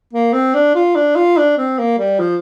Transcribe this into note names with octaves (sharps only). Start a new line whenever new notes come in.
A#3
C4
D4
F4
D4
F4
D4
C4
A#3
G3
F3